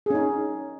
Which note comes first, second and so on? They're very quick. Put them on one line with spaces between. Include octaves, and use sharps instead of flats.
G#4 C#4 D#4